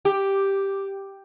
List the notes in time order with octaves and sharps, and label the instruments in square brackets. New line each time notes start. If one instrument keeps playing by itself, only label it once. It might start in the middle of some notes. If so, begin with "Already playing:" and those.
[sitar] G4